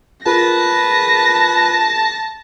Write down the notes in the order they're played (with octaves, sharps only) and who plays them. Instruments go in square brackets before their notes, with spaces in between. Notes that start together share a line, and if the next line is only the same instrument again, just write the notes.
[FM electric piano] F4 G#4 A#4 [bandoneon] B4 [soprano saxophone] A5 [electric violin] A#6